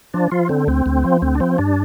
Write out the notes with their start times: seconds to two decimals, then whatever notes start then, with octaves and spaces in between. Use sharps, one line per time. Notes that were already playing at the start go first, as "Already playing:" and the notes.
0.14 F3 D4
0.32 F3 F4
0.49 D3 C4
0.67 D2 C4
0.86 D2
1.04 F3
1.22 D2 C4
1.35 D4
1.40 F3 C4
1.58 G2 D4